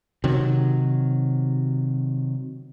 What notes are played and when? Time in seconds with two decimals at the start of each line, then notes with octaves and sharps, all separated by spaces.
0.24 C3 D#3 F#3